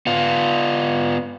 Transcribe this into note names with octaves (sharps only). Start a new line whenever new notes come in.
B3 F4